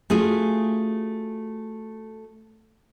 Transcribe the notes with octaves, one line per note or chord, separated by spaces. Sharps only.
A3 C#4 F4 F#4 G#4